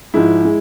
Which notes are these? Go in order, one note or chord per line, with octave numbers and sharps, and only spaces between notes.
G#2 F3 G#3 E4
G#3